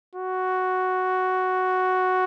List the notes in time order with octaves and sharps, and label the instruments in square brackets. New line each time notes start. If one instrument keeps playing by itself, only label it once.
[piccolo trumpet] F#4